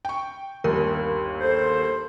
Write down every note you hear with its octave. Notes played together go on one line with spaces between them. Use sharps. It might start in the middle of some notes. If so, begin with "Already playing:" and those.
G5 C#6
G1 D#2 A#4
A4 C5